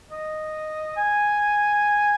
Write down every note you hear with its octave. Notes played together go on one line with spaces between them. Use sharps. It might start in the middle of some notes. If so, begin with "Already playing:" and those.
D#5
G#5